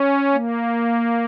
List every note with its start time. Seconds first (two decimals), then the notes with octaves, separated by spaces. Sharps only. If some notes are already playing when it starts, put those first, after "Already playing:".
Already playing: C#4
0.34 A#3